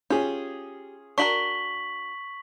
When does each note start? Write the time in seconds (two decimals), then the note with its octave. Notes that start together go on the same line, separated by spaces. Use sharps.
0.10 C#4 F4 G4 G#4
1.18 D4 F#4 A#4 C#6 B6 F#7